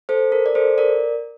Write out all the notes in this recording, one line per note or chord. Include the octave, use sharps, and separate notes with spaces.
A4 C5
A#4
D5
A4 C5
A#4 D5